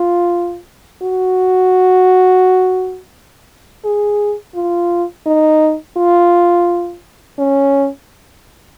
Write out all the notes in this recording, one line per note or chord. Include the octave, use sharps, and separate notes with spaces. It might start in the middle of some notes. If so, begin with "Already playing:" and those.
Already playing: F4
F#4
G#4
F4
D#4
F4
C#4